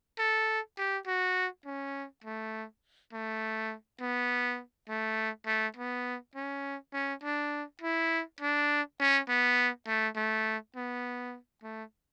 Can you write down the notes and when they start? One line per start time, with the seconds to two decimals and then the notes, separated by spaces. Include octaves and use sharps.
0.19 A4
0.77 G4
1.07 F#4
1.65 C#4
2.24 A3
3.13 A3
4.00 B3
4.89 A3
5.46 A3
5.76 B3
6.35 C#4
6.93 C#4
7.23 D4
7.82 E4
8.41 D4
9.00 C#4
9.29 B3
9.87 A3
10.16 A3
10.76 B3
11.63 A3